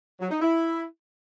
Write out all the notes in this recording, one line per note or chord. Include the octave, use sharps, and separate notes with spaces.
F#3
D#4
E4